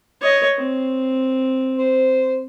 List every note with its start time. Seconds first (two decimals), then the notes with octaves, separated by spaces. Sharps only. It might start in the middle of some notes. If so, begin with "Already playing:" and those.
0.21 C#5 D#5
0.57 C4
1.77 C5